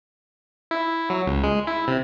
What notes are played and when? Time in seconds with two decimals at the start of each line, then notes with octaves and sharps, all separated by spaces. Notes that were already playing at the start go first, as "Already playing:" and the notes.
0.71 E4
1.10 F#3
1.27 C#2
1.44 G#3
1.67 E4
1.88 C3